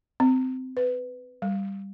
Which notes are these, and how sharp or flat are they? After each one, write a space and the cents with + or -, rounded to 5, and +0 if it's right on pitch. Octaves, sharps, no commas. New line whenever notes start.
C4 -20
B4 +15
G3 +5